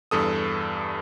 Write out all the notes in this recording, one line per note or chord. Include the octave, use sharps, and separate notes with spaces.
E2 G2 A4 D#6